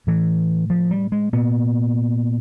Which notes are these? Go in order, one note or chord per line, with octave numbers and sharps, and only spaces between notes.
A2 E3
F3
G3
G#3
A#2 B3